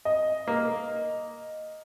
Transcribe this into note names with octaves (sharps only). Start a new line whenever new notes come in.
D#5
A#3